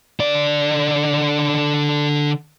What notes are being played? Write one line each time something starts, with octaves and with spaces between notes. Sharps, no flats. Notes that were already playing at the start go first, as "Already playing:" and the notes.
D3 D5